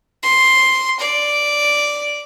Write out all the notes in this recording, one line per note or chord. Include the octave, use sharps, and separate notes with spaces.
C6
D5